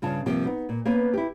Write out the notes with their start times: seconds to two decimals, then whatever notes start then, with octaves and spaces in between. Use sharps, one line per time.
0.02 G2 C#3 F4 A5
0.26 G2 C3 F3 A#3 G4
0.45 B3 D#4
0.69 A#2
0.85 A#3 B3 C#4 B4 C5
1.13 E4 G4